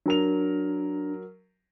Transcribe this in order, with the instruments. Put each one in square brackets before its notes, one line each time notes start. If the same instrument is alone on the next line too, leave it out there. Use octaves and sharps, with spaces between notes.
[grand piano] F#3 A#4 F7 [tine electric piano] D4